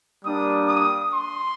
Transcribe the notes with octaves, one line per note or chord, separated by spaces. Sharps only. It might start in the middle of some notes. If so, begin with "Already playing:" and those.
G3 A#3 D4 D#6
D#6
C6